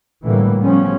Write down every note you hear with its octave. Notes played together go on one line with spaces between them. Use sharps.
A2 D3 E3 F#3 G3 A#3
C#3 F3 G3 B3 C#4